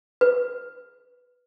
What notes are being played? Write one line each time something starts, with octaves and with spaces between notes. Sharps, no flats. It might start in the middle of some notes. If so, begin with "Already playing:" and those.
B4